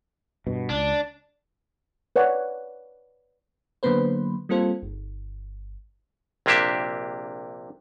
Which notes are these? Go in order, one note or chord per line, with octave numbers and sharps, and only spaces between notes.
G2 B2
C#2 D4
B4 C#5 D5 F#5
D3 F#3 A#3 B3 B4 C5
G3 A#3 C4 F4 A4 C5
G1
A#1 C3 A#3 D4 G4 E5